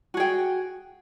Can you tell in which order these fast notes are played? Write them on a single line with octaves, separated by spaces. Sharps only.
F#4 G#4 G5